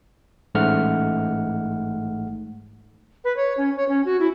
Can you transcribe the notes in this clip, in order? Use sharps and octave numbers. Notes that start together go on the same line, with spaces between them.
A1 G#2 A3 F#5 F6
B4
C#5
C#4
C#5
C#4
F#4
E4